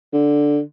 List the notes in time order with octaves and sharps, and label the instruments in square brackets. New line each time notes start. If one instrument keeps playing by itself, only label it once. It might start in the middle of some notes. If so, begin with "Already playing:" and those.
[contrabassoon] D3